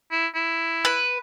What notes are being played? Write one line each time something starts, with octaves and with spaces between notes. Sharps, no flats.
E4
E4
B4